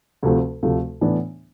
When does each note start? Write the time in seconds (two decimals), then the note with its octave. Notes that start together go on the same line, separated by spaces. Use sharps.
0.22 D2 C3 F3 A3
0.63 D2 C3 F3 A3
1.01 A2 E3 B3 D4